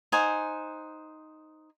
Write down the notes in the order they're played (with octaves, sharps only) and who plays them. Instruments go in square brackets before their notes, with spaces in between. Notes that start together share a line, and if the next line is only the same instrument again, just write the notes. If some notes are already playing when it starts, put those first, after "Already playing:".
[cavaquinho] D#4 C5 F#5 G#5